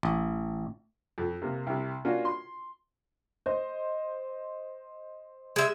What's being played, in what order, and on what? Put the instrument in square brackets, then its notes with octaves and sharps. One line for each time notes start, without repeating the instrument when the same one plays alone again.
[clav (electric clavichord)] A1
[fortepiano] F2
C3 A#3
C2 C3
A#3 C#4 D4 F4 F#4
C6
[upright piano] C5 D#5
[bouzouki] G#3 E5